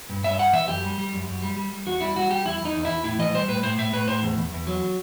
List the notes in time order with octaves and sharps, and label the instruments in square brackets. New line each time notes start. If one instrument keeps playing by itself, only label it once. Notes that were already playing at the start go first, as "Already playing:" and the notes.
[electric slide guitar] G2
G2 E5
G2 F#5
E3 E5
F#2 G4
G3
G3
F#2
F#2
G3
G3
G3
E2 F#4
G3 E4
G3 F#4
G3 G4
E2 E4
E2
D#4
E2
E4
E2
A2 E4
E3 D#5
G3 C5
A2 B4
A2 C5
A2 E5
A2 B4
A2 C5
E2
E2
E2
F#3